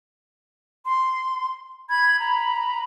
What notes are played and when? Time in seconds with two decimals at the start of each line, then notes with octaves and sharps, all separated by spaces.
0.86 C6
1.89 B5 G#6
2.20 A#5